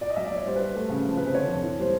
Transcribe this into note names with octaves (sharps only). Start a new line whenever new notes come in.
D5
D#5
F#3 E5
D5
F#3 C#5
G3 C5
B4
G3
A3 B4
C#3
F3
C3 B4
C5
D3 C#5
F2
E3
G3 C5